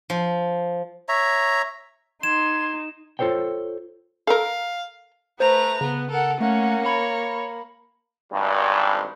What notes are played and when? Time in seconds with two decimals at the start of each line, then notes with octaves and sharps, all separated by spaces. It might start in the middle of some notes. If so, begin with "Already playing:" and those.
0.10 F3
1.09 C#5 E5 A#5
2.23 D#4 C6 G#6 E7
3.19 F4 A4 C5 C#5 G5
4.27 A4 A#4 F5
5.40 A3 B4 C5 A#5
5.81 C#3 B3
6.11 A4 A#4 F#5
6.40 A3 A#3 C#4 F#5
6.86 C#5 B5
8.32 G#1 G2